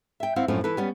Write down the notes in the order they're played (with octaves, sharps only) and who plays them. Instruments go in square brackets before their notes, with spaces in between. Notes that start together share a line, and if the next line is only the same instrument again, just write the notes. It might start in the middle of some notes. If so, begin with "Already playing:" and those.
[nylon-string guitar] E5 G5
C4 E4 F5 F#5
F#2 A2 F3 C4 C#4
E3 A4 B4
G3 B3 C#4